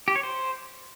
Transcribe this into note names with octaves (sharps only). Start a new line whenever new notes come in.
G4
C#5
C5